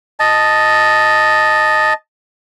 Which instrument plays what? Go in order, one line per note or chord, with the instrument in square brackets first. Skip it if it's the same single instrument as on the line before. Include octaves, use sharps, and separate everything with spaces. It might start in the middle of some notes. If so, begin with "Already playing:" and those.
[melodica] D#5 A5